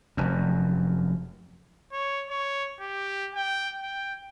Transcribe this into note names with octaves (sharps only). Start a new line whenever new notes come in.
F1 F#2
C#5
C#5
G4
G5
G5